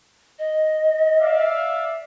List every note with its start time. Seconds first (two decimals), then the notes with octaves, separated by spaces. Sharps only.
0.39 D#5
1.21 D5 E5 F5